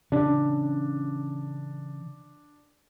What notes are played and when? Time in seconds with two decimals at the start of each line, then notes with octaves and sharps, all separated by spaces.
0.12 C#3 E3 C#4 D4